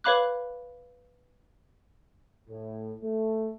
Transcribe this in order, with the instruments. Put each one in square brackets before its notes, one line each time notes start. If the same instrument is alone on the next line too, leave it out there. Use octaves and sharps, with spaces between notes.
[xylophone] B4 C#5 F5 B5 D6 F#6
[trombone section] A2
A3